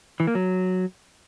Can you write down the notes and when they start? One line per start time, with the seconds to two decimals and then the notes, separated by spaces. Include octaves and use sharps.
0.20 E3
0.27 A#3
0.35 F#3